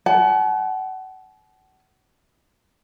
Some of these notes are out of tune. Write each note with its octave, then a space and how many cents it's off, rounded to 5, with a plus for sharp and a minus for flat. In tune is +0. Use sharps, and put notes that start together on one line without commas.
F#5 +30 A5 -45